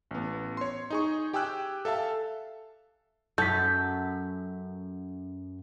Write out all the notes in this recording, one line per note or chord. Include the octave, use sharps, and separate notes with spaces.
A1 B3
C#5 C6
D#4 G#4 C#6
G4 G5 G#5 E6 F#6
A4 E5 F5 A5
F#2 A4 G6 B6